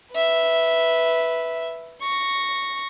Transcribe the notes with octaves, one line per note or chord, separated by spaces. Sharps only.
B4 E5
C#6 A#6